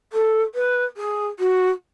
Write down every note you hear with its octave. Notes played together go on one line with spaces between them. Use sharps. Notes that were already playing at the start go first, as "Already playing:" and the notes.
A4
B4
G#4
F#4